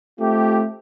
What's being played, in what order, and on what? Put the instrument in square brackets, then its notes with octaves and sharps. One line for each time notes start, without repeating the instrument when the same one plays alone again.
[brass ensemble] A3 C4 F4 G4